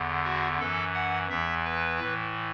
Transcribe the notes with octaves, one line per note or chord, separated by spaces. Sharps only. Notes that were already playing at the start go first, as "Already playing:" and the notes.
Already playing: E2 D3
F#4
F#2 E3 A4
F#5
E2 E3 E5
B4
A2 E3